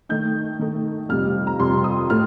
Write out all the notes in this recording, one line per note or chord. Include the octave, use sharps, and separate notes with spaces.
D#3 A3 D#4 G6
D#3 A3 D#4
F2 C3 G3 F6
A#5
F2 C3 G3 C6
D#6
A2 A3 F6